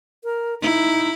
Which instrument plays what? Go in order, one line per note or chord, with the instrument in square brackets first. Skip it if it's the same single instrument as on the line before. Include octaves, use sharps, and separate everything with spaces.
[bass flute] A#4
[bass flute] D#4 [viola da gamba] E4